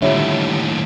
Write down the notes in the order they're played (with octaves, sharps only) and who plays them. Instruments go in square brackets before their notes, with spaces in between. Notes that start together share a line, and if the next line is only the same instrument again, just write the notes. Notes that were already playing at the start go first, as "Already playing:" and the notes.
[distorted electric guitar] D#2 A2 [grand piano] D3 G3 [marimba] F4 C#5 E5